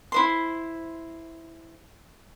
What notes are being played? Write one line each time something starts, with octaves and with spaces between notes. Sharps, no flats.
E4 C5 C6